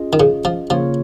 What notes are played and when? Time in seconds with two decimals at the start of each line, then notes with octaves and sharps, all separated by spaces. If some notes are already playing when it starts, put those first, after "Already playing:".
Already playing: C#4 F4 G#4 D#5
0.13 D#3
0.20 C#3
0.45 F3
0.70 C#3 F3 A#3 F4 C#5